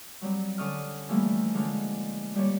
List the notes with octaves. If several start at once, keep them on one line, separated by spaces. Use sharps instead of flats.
F#3 G3 C4
D3 C#4 D5 C#6 D#6 F6
E3 F3 G3 A3 A#3
D3 G#3 C#4 D4 F4
G3 A#3 C#5 D5